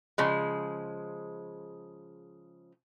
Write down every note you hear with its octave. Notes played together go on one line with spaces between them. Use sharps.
C#3 F3 G#3